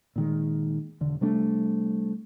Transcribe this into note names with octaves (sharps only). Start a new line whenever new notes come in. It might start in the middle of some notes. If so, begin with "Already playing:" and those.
A#2 D#3 G#3
E1 D3
C3 G3 A3 D4